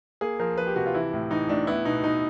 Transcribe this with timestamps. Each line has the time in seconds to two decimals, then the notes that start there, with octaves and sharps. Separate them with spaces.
0.21 A#3 G#4
0.40 F3 A#4
0.58 F3 B4
0.67 G4
0.76 C3 F#4
0.86 F4
0.94 E3 E4
1.13 A2
1.30 E3 D#4
1.49 A2 D4
1.67 B3 E4
1.85 B2 D#4
2.03 B2 D#4